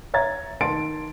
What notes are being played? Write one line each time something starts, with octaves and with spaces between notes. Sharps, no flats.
C#5 E5 A#5 G#6 A6
D#3 D#4 A5 C6 A6 D7